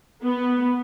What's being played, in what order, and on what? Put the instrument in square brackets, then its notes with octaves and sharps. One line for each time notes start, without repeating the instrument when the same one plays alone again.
[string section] B3